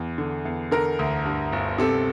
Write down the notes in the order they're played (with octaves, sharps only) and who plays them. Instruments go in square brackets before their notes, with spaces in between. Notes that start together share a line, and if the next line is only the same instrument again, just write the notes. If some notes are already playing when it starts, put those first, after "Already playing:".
Already playing: [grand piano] E2
D3
E2
D3 A#4
D2
G2
G1
C3 A4